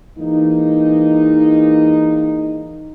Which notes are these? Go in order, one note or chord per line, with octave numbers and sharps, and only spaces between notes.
E3 G#3 A#3 D#4